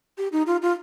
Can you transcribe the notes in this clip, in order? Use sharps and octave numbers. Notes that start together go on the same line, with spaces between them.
G4
D#4
F4
F4